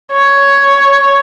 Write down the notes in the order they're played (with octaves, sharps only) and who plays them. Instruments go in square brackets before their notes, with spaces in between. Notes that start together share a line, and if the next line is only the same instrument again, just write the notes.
[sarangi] C#5